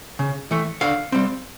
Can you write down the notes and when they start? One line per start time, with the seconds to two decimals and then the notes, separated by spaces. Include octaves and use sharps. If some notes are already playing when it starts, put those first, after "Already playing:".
0.19 C#3
0.51 E3 A3
0.81 D3 F5
1.12 G3 C4